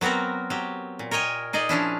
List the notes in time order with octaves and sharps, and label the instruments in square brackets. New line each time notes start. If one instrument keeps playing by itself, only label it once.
[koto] F#3 B3 C4 F#4 A#4
F#3 G4
A#2
A#4 C#5 D#5 G5 G#5
D#4 G#4 D5 D#5
F3 C#4 D4 E4